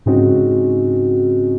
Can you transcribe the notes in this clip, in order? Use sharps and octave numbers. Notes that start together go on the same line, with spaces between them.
G#2 C#3 C4 C#4 D#4 F#4